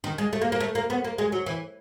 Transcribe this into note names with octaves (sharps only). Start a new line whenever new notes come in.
D#3
G#3
A3
A#3
A#3
A3
A#3
B3
A#3
G#3
F#3
E3